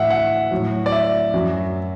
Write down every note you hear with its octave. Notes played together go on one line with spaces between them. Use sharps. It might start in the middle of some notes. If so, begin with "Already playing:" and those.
Already playing: A2 E3 E5 F#5
F#5
A2 F#3
D5
E5
F#2 F#3